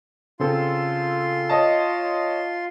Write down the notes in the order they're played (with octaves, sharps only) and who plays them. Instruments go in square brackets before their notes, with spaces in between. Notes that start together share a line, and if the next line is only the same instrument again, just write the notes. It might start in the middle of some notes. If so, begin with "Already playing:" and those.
[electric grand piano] C#3 C4 A4 [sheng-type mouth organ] F4 C6
[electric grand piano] C#5 D#5 A5